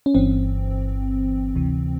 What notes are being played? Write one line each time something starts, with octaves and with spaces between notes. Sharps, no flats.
C#4
G1 G2 E3 C4
D2 C3 E3